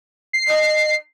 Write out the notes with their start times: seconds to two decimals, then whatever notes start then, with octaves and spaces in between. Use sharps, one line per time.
0.33 C7
0.48 D#5